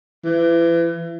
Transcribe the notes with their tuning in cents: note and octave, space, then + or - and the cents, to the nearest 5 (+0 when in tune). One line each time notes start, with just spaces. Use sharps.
E3 +30